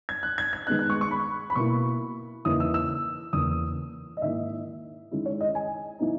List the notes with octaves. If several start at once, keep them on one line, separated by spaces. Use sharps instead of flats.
G#6
F#6
G#6
G#6
D#3 G#3 B3 D#4 F#6
F#6
C#6
C#6
B5
B5
B2 A#3 E4 C#6
E2 C#3 E3 A#3 D#4 D#6
E6
E6
E2 C#3 E3 A#3 D#6
D#5
G#2 D#3 A#3 E4 E5
D#3 G#3 C#4 E4
C#5
D#5
G#5
E3 B3 D#4